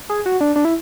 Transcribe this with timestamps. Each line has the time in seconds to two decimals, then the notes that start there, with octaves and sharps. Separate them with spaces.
0.09 G#4
0.26 F#4
0.41 D4
0.56 D4
0.65 E4